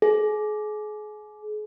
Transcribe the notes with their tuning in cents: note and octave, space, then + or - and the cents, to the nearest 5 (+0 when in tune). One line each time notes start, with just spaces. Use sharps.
G#4 +35